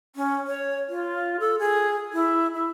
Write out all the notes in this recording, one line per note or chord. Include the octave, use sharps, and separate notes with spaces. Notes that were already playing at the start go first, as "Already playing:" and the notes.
C#4
C#5
F4
A4
G#4
E4
E4